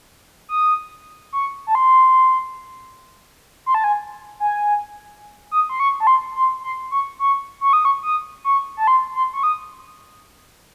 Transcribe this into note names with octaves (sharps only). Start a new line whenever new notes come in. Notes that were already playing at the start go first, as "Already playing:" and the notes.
D#6
C#6
A5
C6
C6
A5
G#5
G#5
D#6
C6
C#6
A5
C6
C6
C6
C#6
C#6
C#6
D#6
C#6
D#6
C#6
A5
C6
C6
C#6
D#6